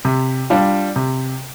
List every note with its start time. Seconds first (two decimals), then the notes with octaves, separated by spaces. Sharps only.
0.05 C3
0.50 G3 D4 F4
0.96 C3